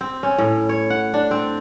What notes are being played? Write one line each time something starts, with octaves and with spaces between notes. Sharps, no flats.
C4
C#4
A2
C#5
F#5
D4
C4